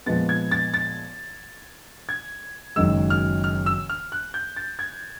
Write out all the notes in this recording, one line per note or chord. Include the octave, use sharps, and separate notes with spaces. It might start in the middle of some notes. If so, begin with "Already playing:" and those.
A#2 F3 G#3 B3 A6
G#6
A6
A6
G#6
F#1 F#2 D#3 G#3 E6
F6
F6
E6
F6
F#6
G6
A6
G#6